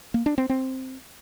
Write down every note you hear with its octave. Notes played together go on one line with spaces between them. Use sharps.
A#3
D4
C4
C4